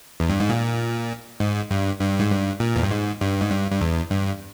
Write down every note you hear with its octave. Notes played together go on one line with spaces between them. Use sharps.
E2
G2
G#2
A#2
G#2
G2
G2
G#2
G2
A#2
E2
G2
G#2
G2
G#2
G2
G2
E2
G2